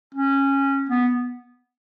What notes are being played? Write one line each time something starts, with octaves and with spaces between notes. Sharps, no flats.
C#4
B3